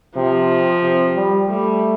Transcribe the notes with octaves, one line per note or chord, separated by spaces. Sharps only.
C3 F3
C3
G3
G3 A3